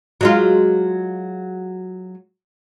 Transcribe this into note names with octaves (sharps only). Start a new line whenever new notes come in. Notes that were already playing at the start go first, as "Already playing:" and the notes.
F#3 G#3 F4